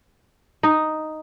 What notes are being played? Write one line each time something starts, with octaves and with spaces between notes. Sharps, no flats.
D#4